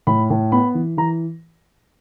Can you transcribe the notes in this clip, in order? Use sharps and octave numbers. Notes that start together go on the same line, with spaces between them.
A2 B5
A2
B3 B5
E3
E3 A#5